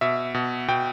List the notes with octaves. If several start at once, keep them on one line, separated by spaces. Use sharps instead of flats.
B2 E5
B2
B2 G5